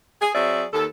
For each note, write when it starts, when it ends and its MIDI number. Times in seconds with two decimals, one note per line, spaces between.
0.22 0.32 68
0.35 0.65 54
0.35 0.65 60
0.35 0.65 68
0.35 0.65 74
0.35 0.65 76
0.73 0.86 39
0.73 0.86 69